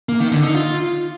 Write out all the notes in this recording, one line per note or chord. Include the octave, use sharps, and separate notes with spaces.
A#3
D#3
D3
D#4
F4